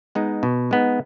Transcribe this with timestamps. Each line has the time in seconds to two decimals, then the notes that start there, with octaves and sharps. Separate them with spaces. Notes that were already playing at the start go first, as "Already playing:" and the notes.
0.15 G#3 B3 D#4
0.43 B2
0.71 G#3 B3 D#4